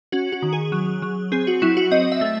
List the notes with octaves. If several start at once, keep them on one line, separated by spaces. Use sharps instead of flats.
C#4 F#4
F#4
D#3
G#4
F#3
F#3
C4 G#4
F#4
F#3 E4
F#4
C4 D#5
E5
A3